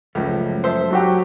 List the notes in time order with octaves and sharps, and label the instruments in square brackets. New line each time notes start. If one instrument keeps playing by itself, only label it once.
[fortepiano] C#2 [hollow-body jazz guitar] F#2 F3 A3
[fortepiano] C5 E5 A5
[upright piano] F#3 F#4 G4